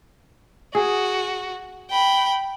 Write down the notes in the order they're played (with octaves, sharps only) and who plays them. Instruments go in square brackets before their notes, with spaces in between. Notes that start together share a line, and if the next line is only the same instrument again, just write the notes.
[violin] F#4 [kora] G#4
[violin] G5 B5